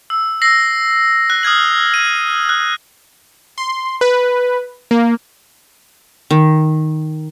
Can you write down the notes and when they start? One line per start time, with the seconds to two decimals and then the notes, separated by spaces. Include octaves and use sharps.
0.10 E6
0.42 E6 A#6 C7
1.30 F#6
1.43 D#6 F6 G#6 F#7
1.94 D#7
2.49 F#6
3.58 C6
4.01 B4
4.91 A#3
6.31 D#3